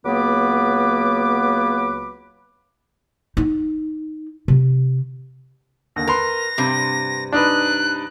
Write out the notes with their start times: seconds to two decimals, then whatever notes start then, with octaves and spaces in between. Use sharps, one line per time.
0.05 C#2 F#3 A#3 B3 B4 D6
3.37 D#4
4.48 C3
5.96 D#2 D3 A#6
6.07 A#4 B4 C6
6.58 G2 C3
7.33 D4 D#4 B4 F#6